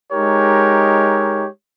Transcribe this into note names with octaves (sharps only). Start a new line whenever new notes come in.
G#3 D#4 G4 A#4 C#5